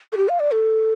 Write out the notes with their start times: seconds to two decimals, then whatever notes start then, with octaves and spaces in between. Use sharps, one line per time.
0.12 A4
0.17 G4
0.29 F5
0.40 D5
0.51 A4